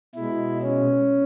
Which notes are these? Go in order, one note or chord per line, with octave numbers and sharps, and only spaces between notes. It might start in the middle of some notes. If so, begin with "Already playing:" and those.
B2 G#3 E4
C#4